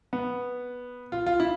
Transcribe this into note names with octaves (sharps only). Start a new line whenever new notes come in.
B3
F4
F4
E4